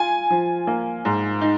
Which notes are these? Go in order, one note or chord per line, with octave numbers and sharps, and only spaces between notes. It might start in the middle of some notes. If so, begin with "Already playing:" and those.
Already playing: F4 G#5
F3
A#3
G#2
D#4